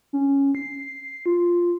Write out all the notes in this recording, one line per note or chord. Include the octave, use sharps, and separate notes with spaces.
C#4
C7
F4